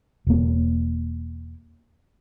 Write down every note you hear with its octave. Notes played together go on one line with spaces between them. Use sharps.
E1 A#3